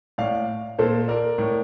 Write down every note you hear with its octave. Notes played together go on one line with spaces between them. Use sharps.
A2 D5 F5
A#2 A4 C5
A#4 D5
A2